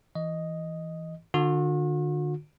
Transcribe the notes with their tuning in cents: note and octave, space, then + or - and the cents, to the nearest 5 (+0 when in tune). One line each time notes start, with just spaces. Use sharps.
E3 +0 D#5 +0
D3 +25 F#4 -45